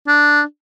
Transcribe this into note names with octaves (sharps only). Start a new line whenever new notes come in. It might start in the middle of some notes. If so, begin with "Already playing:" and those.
D4